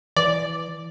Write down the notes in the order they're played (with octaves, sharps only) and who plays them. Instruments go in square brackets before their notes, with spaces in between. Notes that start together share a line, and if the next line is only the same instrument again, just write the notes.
[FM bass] E3 [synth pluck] D5